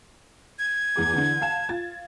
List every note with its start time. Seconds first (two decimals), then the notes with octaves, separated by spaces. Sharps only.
0.59 G#6
0.96 E2 G#4 D6
1.12 D3 E3
1.41 F5 A5 E7
1.69 F4 G#6 A6